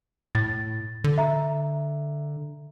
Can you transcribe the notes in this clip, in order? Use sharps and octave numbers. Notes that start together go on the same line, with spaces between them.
A2 A6
D3
E5 A#5